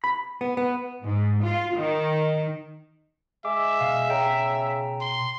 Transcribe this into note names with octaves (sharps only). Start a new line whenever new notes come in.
B5
B3
B3
G#2
F4
D#3
G#3 E5 D6
B2 F5
C#3 G5 A#5
C6